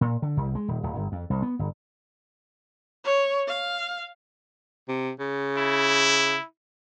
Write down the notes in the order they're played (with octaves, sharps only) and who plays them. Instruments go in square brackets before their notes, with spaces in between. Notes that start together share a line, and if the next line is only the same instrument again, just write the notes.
[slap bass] A#2
D3
C2
G#3
D#1
D1
G1
F2
C2
B3
G1
[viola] C#5
F5
[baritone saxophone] C3
C#3
[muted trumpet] E4